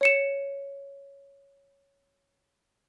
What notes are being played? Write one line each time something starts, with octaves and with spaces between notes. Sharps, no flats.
C#5 C#7 E7